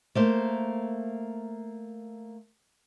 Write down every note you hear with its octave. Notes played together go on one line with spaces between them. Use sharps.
A3 A#3 C5